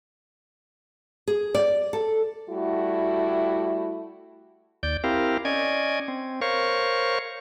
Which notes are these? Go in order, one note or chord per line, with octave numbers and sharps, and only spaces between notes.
G#4
D5
A4
G3 A3 E4 F#4
D#2 D5 G6
C4 E4 G4 A#4 F5
C#4 D5 D#5 G#6
C4
A#4 C5 C#5 F5 C#6